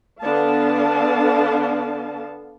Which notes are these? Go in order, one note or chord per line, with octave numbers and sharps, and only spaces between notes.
D3 B3 D4 F5 A5